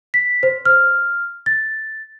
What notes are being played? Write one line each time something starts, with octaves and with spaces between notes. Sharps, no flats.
B6
C5
F6
A6